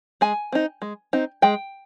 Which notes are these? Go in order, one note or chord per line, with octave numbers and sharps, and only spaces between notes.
G#3 G#5
C4 D#4
G#3
C4 D#4
G#3 G5